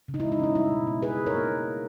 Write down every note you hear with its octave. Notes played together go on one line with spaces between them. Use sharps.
C#3
D#4
G#3 E4
D#4
C#4 E4
G3 E4
B2
B3
D#4 G#4 B4
D#4
A#4 C#5
A#3